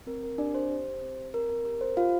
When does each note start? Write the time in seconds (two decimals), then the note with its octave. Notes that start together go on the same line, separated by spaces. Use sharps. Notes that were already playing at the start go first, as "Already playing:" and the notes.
0.07 C4 A#4
0.23 A#4
0.38 D4 G4 D5
0.54 C5
0.70 G4
1.02 C4
1.33 C4 A#4
1.50 A#4
1.65 G4 A#4
1.81 C5
1.97 F4 G4 F5